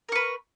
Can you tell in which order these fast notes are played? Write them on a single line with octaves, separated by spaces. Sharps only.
A#4 C#6 B4